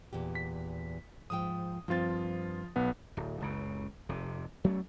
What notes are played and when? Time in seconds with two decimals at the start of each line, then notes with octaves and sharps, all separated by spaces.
0.13 E2 A#2 G4
0.35 B6
1.30 G#2 F3 G5 D#6
1.88 G2 F3 C4 F4 A6
2.76 B1 B3 F#5
3.17 D1
3.41 F#1 C#2 C#3
4.09 F1 C3
4.64 F#3 A3 C#4